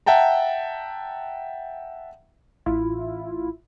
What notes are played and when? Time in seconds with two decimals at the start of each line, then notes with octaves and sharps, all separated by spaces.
0.06 E5 F#5 G5 A5 A#5
2.66 A1 E4 F4